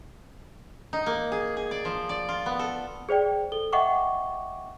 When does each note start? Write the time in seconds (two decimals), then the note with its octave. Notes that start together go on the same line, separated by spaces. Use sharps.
0.93 D#4
1.06 A#3
1.32 G#4
1.57 G#4
1.71 D5
1.85 F3
2.09 D5
2.29 F4
2.46 B3
2.59 A4
3.09 G#4 C5 D5 G5
3.52 A4 G7
3.73 D#5 E5 F#5 G5 C#6 D6